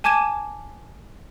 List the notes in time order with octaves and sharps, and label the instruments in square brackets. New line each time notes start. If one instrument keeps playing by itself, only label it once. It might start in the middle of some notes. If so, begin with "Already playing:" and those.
[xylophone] G#5 A5 D6 G#6 D#7 E7